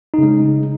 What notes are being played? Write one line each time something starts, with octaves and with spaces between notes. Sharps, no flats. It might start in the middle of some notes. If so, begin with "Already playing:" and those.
C#3 G#3 D#4